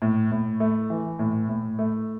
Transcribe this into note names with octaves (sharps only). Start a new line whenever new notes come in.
A2
A2
A3
E3
A2
A2
A3